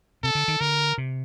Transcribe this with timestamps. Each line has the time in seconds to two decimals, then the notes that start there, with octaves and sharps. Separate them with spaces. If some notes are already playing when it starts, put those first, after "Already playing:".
0.23 C3 A4
0.35 D3
0.48 D#3
0.61 D3 A#4
0.98 C3